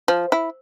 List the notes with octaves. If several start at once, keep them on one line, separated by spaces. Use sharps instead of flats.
F3
E4